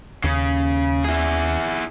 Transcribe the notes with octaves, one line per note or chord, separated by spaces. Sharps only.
D#2 C#3 C#4
E4 G#4